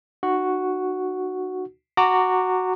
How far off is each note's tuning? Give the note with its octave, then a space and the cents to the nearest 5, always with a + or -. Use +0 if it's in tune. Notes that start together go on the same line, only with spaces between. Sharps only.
D#4 -40 F#4 +0
F#4 +0 A#5 -25 D6 +0